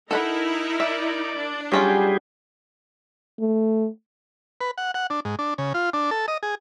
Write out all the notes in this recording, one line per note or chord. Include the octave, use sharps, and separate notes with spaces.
D#4 E4 A4 A#4 F#5 B5
D5 E5
D4
F#3 G3 C#4 F4 G4 G#4
A3
B4
F#5
F#5
D4
G#2
D4
C#3
F4
D4
A4
D#5
G#4